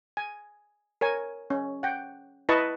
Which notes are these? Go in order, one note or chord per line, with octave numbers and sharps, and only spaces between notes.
G#5
A#4 C#5 G#5
C#4
F#5 G5
E4 B4 D#5 A5 C#6